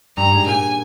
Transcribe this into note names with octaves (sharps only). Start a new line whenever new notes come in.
G2 G3 A#5
G#2 G#3
A#2 A#3 G#5